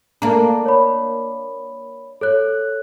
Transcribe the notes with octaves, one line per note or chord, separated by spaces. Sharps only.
A#3 D4 A4 A#5
C#5 B5
A4 C#5 F#6